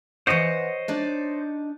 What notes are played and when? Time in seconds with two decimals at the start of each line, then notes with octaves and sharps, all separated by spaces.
0.27 E3 C5 C#5 D#5 F#5
0.88 D4 D#4 D5